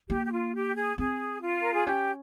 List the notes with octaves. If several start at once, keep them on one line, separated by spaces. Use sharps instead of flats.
A#3 G4
G4
F4
G4
G#4
C4 G#4
F4
A#4
G#4
C#4 G4